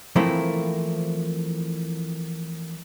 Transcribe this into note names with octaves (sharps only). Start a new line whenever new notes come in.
E3 F3 A3 A#3 C4 E4